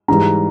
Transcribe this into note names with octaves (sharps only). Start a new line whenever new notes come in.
G#2 E3 G3 A#5